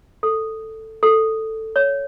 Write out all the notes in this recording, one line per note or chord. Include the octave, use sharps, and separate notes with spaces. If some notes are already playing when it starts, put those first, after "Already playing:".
A4
A4
C#5